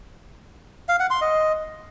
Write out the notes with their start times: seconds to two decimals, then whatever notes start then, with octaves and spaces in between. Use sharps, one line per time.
0.89 F5
1.00 F#5
1.11 C6
1.21 D#5